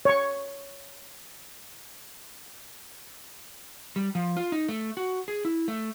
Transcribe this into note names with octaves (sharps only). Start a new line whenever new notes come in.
C#5 C#6
G3
F3
F4
D#4
A3
F#4
G#4
E4
A3